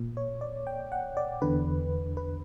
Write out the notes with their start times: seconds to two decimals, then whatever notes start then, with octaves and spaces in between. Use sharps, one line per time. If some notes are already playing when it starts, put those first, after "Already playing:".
Already playing: A#2
0.17 C#5
0.41 D5
0.67 G5
0.92 F#5
1.17 D5
1.42 E2 D3 B4
2.17 B4